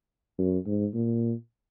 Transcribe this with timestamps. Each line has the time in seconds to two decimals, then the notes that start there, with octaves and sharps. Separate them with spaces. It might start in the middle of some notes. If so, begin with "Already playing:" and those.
0.38 F#2
0.66 G#2
0.94 A#2